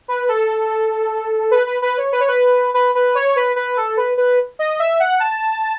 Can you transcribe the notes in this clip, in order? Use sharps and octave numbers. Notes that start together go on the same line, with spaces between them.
B4
A4
B4
B4
B4
C#5
B4
C#5
B4
B4
B4
C#5
B4
B4
A4
B4
B4
D#5
E5
F#5
A5